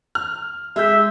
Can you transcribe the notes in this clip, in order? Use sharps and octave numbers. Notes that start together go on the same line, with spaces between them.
F6
G#3 E5 G6